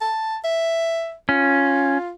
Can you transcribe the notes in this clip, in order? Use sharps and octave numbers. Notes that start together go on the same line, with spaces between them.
A5
E5
C#4 F4